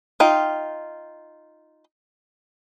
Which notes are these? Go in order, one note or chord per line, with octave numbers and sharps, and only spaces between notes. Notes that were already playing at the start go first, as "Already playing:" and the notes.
D#4 F4 G5